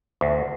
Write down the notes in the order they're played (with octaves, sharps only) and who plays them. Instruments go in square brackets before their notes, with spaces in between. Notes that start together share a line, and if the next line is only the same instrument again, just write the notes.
[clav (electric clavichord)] D2